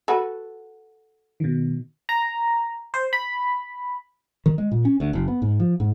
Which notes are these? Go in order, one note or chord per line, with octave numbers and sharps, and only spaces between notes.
F#4 A4 B4
B2 D#3
A#5
C5
B5
D#3
G#3
A#2
C#4
D2
F#1
B3
G#2
F3
G#2